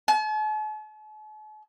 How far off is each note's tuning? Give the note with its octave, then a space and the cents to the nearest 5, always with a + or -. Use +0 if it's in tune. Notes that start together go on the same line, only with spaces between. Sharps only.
A5 -45